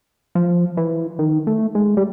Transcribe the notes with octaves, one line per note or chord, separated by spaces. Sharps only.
F3
E3
D#3
A3
G#3
G3